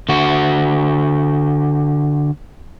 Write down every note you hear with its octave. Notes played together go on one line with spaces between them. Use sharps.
D3 F#4